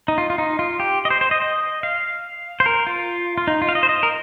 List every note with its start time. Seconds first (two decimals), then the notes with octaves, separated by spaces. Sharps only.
0.08 D#4
0.18 F4
0.30 F4
0.38 D#4
0.59 F4
0.80 G4
1.05 D#5
1.10 C5
1.21 C5
1.31 D#5
1.42 D#5
1.83 F5
2.60 C5
2.66 A#4
2.87 F4
3.38 F4
3.48 D#4
3.62 F4
3.69 F5
3.75 D#5
3.83 C5
3.89 D#5
4.03 A#4